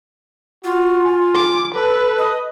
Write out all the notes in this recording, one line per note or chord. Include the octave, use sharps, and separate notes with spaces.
F4 F#4
G#5
D6
A4 B4
D#5